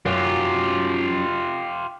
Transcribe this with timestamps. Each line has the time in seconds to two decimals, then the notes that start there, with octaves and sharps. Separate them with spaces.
0.06 F#2 F4 G4